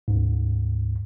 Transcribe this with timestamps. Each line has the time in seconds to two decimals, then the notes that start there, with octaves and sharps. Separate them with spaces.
0.08 D2 G#2